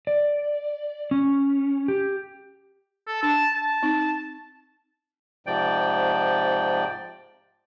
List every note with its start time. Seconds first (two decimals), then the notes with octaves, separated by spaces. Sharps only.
0.07 D5
1.11 C#4
1.88 G4
3.07 A4
3.23 D4 A5
3.54 A5
3.83 C4 D#4
5.47 G#2 C3 F3 D5 G5